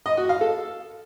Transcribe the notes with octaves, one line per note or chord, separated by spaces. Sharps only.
D#5
F#4
F5
A4